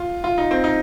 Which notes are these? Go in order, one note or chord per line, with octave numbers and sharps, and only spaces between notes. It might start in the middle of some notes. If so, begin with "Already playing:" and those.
Already playing: F4
F4
D#4
C4
D#4